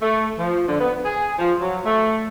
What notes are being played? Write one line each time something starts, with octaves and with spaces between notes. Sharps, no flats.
A3
F3
D3
B3
G#4
F3
F#3
A3